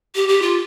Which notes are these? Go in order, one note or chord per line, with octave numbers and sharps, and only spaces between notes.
G4
G4
F4